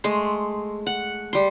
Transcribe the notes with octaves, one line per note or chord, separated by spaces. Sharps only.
G#3 A3 C6
F#5
G3 C6